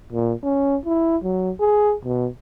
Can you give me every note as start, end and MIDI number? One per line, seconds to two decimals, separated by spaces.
0.12 0.33 46
0.43 0.77 61
0.85 1.17 64
1.24 1.51 54
1.59 1.94 68
2.04 2.28 47